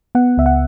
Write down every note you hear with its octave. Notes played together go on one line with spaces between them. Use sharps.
B3 F#5
C#2 E5
F#5